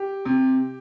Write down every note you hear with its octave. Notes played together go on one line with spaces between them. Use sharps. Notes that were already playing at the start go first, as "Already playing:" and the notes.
Already playing: G4
C3